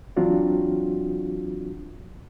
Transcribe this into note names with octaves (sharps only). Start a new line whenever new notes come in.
E3 F#3 C4 D4 F4 F#4